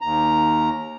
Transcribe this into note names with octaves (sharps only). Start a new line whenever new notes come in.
D#2 A#5